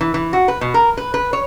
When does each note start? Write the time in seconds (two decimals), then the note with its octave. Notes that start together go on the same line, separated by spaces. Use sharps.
0.01 E3
0.14 E3
0.33 F#4
0.48 B4
0.61 B2
0.74 A#4
0.97 B4
1.14 B4
1.33 C#5